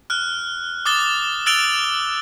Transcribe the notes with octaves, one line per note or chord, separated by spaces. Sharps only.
F6 F#6
D6 D#6 F#6 A6 G7
E6 F#6 A6 D7 F7 G7